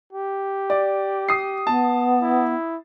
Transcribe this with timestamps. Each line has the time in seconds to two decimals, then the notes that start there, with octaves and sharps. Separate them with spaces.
0.13 G4
0.70 D5
1.29 D#6 C7
1.67 B3 A5
2.22 E4